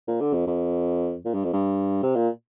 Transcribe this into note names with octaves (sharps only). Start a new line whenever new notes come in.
A#2
D3
F2
F2
A#2
G2
F2
G2
C3
A#2